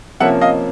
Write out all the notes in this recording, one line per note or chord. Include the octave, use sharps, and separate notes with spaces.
C3 F3 A#3 C#4 E5 F#5
D#5 F5